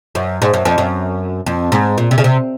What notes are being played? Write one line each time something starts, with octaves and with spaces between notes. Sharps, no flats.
F#2
G#2
F#2
F2
F#2
F2
G#2
A#2
C3
C#3
C3